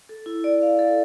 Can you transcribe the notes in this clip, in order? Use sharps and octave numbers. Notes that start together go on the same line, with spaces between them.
A4
E4
D5
F5
A4